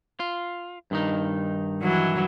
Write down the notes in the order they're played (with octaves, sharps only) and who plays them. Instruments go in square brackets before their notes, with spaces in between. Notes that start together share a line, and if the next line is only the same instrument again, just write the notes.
[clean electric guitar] F4
G2 D#3 D#4
[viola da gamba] E3 F#3